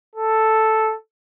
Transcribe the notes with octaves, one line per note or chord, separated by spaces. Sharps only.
A4